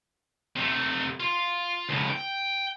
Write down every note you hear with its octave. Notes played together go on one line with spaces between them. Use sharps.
C3 A3
F4
C#2 A2
G5